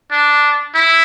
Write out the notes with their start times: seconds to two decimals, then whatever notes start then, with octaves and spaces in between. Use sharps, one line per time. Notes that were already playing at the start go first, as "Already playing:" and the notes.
0.11 D4
0.75 E4